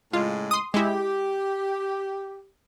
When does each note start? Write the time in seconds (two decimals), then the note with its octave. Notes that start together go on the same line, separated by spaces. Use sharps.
0.13 A2 C#3 G#3 F4
0.51 C6 D#6
0.74 G#3 E4 G4